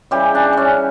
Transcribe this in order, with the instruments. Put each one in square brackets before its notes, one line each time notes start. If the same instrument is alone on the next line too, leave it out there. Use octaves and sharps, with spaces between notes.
[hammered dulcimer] C#3 E3 G3 G4
D4
C#4 D4